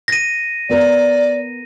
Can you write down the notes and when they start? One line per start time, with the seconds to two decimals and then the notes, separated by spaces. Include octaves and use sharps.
0.08 A#6 D#7
0.69 B3 A#4 D5